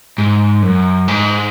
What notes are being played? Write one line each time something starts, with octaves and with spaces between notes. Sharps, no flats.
G#2
F#2
G#2